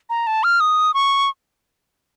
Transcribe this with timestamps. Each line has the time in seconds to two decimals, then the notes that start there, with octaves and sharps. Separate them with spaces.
0.10 A#5
0.27 A5
0.44 F6
0.60 D#6
0.94 C#6